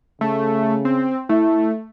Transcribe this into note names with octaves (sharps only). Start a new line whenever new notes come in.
C#3 A3
C4
A3 E4